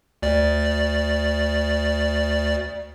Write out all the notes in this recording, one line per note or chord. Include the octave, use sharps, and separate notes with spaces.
D2 D5